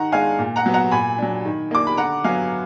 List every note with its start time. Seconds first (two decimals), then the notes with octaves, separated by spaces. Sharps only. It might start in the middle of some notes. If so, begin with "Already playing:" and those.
Already playing: D#3 F#5 A#5
0.12 G#3 D4 F5 G#5
0.39 A#2
0.56 F#5 A#5
0.66 F#3 B3
0.74 F#5 A#5
0.91 A#2 G#5 B5
1.18 F#3 D4
1.45 D#3
1.71 A#3 D4 D6
1.87 B5
1.97 D3 F#5 A#5
2.24 F#3 B3 F5 G#5